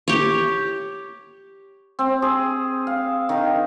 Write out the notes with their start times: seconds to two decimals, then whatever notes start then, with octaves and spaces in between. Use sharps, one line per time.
0.08 G4 C#5
1.99 C4
2.22 G#4
2.87 F5
3.29 D#3